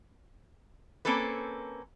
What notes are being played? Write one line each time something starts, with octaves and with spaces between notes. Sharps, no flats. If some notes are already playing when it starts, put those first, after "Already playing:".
A#3 C4 C#4 A4 B4